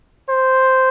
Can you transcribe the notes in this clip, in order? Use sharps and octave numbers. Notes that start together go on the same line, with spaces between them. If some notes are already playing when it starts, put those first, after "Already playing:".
C5